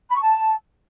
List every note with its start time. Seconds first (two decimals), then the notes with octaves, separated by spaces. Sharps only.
0.09 B5
0.15 C#6
0.20 A5